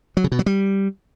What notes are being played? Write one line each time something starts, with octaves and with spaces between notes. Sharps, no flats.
F#3
C#3
B2
F#3
G3